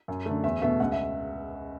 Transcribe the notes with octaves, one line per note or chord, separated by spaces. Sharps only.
F#2
D3 A3
E2 E5
B2 A3 E5
C#2 F#5
E5